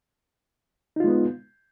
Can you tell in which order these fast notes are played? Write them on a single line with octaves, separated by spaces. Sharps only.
D#4 F4 G#3 B3